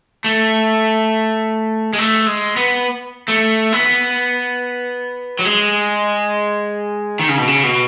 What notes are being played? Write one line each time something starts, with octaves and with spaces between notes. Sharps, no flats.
A3
G#3
A3
G#3
B3
A3
B3
F#3
G#3
D#3
C#3
B2
C#3
B2